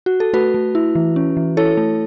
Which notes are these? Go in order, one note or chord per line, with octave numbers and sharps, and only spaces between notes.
F#4
A4
A3 F#4 B4
A3
E4
E3
C#4
E3
E4 A4 C#5
A3